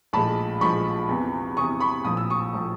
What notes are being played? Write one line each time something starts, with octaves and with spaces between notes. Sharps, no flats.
A#1 A2 F3 G#3 A5 B5
A#1 A2 F3 G#3 B5 C#6
E2 C3 E3
E2 C3 E3 C#6 D#6
B5 C#6
A#1 A2 F3 D#6
E6
C#6 D#6
A2 F3